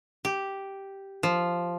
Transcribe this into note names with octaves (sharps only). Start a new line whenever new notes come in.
G4
F3